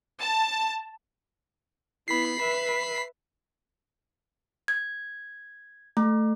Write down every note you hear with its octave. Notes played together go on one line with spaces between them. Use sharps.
A5
B3 E4 B5 B6 C7
B4 E5
G#6
A3